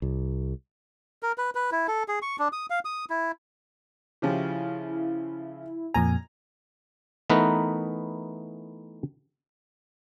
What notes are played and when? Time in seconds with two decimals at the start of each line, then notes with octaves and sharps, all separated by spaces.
0.02 C2
1.23 A#4
1.38 B4
1.55 B4
1.72 E4
1.88 A4
2.08 G#4
2.22 C#6
2.39 D4
2.53 D#6
2.70 F5
2.85 D#6
3.10 E4
4.22 C#3 F3 E4 G4
5.94 F2 A#2 G#5 A#5
7.30 E3 A3 B3 D#4 A#4 B4